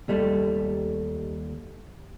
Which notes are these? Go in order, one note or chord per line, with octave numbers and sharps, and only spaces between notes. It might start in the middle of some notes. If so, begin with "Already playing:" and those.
D#2 G3 A3